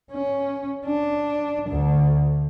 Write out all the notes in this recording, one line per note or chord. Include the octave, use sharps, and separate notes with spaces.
C#4
D4
D2